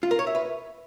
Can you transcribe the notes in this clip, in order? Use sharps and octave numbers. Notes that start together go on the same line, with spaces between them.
F4
A#4
C#5
E5
B4